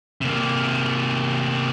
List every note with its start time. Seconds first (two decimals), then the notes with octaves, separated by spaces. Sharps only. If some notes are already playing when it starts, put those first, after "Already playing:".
0.21 C3 A#3